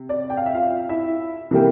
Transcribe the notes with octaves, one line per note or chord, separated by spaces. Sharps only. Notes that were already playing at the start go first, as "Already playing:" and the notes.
Already playing: C3
D5
G5
F5
E5
F4 F5
E4 E5
C3 E3 G3 A#3 G5